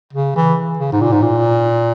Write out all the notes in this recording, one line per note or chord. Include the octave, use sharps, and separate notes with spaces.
C#3
E3
C#3
G#2
A#2
G#2
A#2